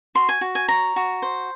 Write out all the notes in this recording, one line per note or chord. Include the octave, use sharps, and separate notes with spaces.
F#4 C6
G#5
F#4
G#5
C#5 A#5
F#4
C5